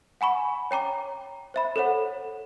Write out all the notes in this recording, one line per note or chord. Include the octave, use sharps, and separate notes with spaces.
F#5 G#5 B5 C#6
C#5 G5 A#5 D6
C5 E5 B5
A4 C5 C#5 F#5